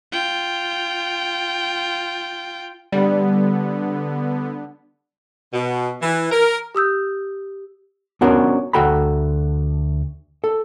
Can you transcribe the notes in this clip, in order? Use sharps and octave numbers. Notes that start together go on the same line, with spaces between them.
F4 G5
D3 G3 B3
B2
E3
A#4
G4 D#6 E6 G6
B3 C#4 D4 F#4 A#4 C5
D2 F#4 A4 G5 A#5 B5
A4